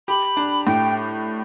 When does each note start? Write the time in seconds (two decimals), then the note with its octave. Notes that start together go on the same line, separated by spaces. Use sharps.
0.08 G4 B5
0.37 D4
0.67 A2 G5